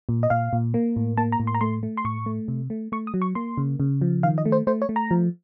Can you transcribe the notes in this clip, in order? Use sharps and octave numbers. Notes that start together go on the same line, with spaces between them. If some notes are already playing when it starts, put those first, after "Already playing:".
A#2
D#5
A#2 F5
A#2
A#3
A2
A#3 A5
A#5
A2
C6
A#5
A3 C6
A3
C6
A2 C#6
A3
C3
A3
A3 C#6
D#6
F#3
C#6
A#3 C6
C#3
C#3
F3
D#3 F5
D#5
A3
C5
A3 C5
C#5
A3
A#5
F3